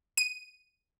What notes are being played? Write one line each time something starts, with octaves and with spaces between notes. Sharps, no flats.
D#7